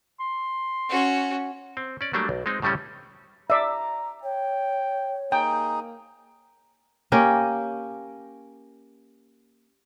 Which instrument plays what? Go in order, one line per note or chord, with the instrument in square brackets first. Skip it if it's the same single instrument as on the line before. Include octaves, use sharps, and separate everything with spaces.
[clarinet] C6
[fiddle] C#4 F#4
[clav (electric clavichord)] C4
C#4 D5
F#3 G3 A3 A#3 D4
B1
G#3 C4 D#4
A2 C#3 G3 A3 C#4
[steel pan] D5 E5 [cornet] A#5
[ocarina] C#5 [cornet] G5
[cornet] A#3 [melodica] D#4 G#4 [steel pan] G5
[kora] A#3 C#4 G4